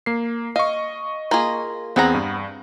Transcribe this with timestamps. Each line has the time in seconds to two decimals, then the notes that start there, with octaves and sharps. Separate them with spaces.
0.06 A#3 C7
0.56 D#5 F5 C#6
1.31 A#3 F4 G#4
1.96 E2 B3 C4 G#4 F#5 A#5
2.14 G2